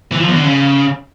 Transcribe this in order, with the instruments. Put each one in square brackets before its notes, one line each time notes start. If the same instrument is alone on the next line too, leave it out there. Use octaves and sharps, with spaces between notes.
[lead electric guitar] E3
F3
E2
D3
C#3